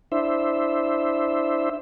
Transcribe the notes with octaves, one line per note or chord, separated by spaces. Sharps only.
D4 E4 C5 E5